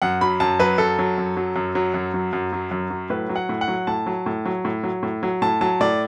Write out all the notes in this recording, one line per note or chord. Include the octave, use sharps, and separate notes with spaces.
F#2 F#5
F#3 B5
F#2 A5
F#3 B4
F#2 A4
F#3
F#2
F#3
F#2
F#3
F#2
F#3
F#2
F#3
F#2
F#3
A2 B4
F#3
F#5
A2
F#5
F#3
A2 A5
F#3
A2
F#3
A2
F#3
A2
F#3
A2 A5
F#3 A5
A2 D5